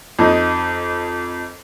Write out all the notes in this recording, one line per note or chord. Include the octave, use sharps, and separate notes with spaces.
F2 D#4